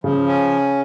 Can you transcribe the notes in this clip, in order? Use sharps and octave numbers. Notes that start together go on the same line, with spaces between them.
C#3 F3
C#4